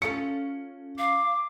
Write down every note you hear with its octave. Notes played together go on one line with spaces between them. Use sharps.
C#4 F4 A4 C#7
F5 D6